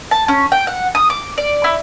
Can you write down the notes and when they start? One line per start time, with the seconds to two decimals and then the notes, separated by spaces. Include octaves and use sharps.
0.11 A5
0.28 C#4
0.52 G5
0.67 F#5
0.95 D#6
1.10 D6
1.38 D5
1.64 E4